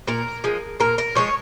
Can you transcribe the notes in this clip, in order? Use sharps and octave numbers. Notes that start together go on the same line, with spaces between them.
A#2 A#4
F3 G#3
A#2 A#4
A#4
F3 G#3 C#5